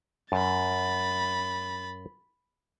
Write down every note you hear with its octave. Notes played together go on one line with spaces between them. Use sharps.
F#2 B5 A6